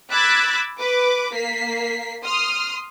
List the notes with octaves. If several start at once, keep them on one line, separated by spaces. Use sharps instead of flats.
B5 D6 E6 F#6 G#6 A6
B4 D6
A#3 B6 C7
C6 D#6 F6